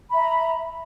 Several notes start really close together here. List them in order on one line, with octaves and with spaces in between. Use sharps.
B5 E5 A#5